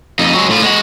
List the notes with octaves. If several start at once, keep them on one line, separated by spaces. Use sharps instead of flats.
F2 D#4
F#3 G#3
A2 F4
G#3 F#4